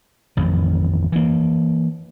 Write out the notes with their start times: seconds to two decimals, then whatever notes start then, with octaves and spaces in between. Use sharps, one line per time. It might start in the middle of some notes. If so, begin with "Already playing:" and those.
0.37 A1 F2 D#3
1.12 E3 A#3